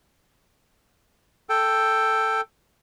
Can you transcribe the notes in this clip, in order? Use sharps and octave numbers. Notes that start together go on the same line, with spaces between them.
A4 G5